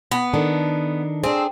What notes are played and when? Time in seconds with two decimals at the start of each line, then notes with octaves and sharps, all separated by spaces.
0.11 B3
0.34 D#3 D4 A4
1.24 C4 D4 G#4